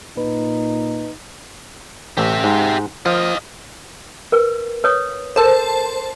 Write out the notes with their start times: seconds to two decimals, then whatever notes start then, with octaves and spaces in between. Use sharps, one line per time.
0.17 A#2 D#4 B4
2.17 A1 G4 E5
2.44 G#2
3.06 F3 D#5 F5
4.32 A#4 B4
4.84 B4 C#5 D#6
5.36 A4 A#4 C5 A5